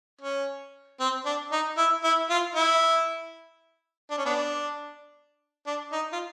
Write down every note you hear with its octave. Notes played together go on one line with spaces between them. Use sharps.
C#4
C4
D4
D#4
E4
E4
F4
E4
D4
C#4
B3 D4
D4
D#4
F4